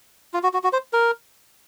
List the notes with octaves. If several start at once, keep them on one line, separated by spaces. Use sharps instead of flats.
F4
F#4
F#4
F#4
C5
A#4